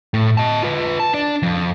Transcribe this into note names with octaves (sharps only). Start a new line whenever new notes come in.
A2
D#5 A5
F4 B4
A5
D4 D5
F2